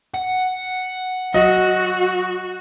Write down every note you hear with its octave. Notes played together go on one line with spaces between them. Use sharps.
F#5
F#3 F#4 D#5